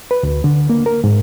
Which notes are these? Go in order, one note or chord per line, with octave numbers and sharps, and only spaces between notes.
B4
D2
D3
A#3
A#4
G#2